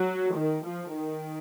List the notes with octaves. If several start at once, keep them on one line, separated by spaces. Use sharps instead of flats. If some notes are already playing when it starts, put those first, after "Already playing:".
Already playing: F#3
D#3
F3
D#3